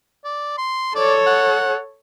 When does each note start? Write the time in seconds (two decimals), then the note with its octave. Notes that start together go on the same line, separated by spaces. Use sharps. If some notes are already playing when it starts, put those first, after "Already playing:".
0.25 D5
0.58 C6
0.95 A4 C#5 D5
1.27 F#5